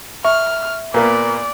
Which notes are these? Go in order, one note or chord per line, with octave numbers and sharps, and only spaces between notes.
E5 C#6 F6
A#2 A#3 B3 D5